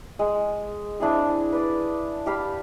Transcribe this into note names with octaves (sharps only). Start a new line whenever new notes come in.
G#3
C4 D4 E4 G#4
B4 D5
G4 F5 B5